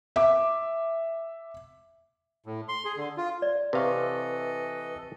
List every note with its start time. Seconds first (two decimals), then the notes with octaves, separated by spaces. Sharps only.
0.16 E5 D6
2.46 A2
2.68 C6
2.85 G#4
2.97 D3
3.17 F4
3.42 D5
3.73 C3 E3 A4 B4 D#5 F5 C#6